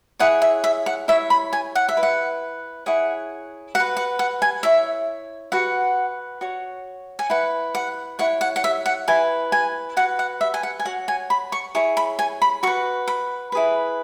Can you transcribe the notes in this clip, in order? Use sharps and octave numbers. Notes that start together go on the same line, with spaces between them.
E4 G#4 C#5 F#5
E5
E5
F#5
E4 C#5 E5
B5
G#5
F#5
E5
E4 B4
F#5
E4 G#4 C#5 F#5
F#4 B4 F#5
F#5
F#5
G#5
E4 C#5 E5
F#4 B4 F#5
F#4 C#5
G#5
E4 B4 F#5
F#5
E4 C#5 F#5
F#5
F#5
E5
F#5
E4 B4 G#5
G#5
F#4 B4 F#5
F#5
E5
G#5
F#5
G#5
F#4 C#5 F#5
G#5
B5
C#6
E4 G#4 C#5 C#6
B5
G#5
B5
F#4 B4 C#6
B5
E4 G#4 B4